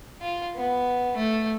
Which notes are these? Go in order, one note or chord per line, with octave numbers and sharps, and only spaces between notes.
F4
B3
A3